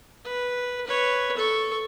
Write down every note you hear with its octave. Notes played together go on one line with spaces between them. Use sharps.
B4
B4 C#5
A4 C#6